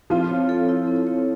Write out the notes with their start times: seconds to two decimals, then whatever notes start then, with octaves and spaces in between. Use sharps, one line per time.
0.10 F3 C4 F4
0.30 C#5
0.49 A4
0.69 E4
0.87 C4
1.07 C#5